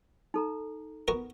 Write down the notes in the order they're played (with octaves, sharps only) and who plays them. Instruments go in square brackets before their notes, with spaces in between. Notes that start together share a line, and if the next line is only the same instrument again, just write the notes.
[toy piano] D#4 A4 A#5
[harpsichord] B3 F#4 A#4